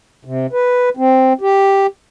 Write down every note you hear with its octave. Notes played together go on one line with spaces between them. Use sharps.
C3
B4
C4
G4